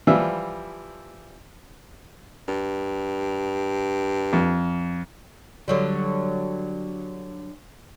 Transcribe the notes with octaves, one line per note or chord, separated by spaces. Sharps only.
E3 F3 G3 F4 E5
G2
F2
D3 F#3 G3